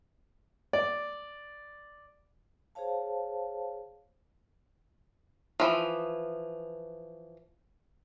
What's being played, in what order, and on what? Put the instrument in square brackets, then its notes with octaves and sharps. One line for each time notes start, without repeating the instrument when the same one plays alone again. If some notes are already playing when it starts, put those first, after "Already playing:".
[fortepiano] D5
[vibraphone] G#4 C5 C#5 F5 A5
[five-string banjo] E3 F3